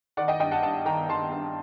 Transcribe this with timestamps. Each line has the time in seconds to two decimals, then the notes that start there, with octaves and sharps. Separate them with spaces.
0.17 D#3 D5 F#5
0.28 D#5 G5
0.39 G2 D#5 G5
0.51 F#5 A5
0.62 G2 F#5 A5
0.85 D#3 G5 A#5
1.09 D#3 A5 C6
1.31 G2